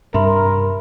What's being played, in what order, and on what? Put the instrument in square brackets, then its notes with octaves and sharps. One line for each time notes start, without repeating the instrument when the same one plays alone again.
[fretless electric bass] G2 C3 [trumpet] A#4 [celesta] E5 B5 C6